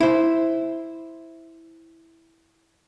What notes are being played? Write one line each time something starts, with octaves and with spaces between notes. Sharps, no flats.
E4 C5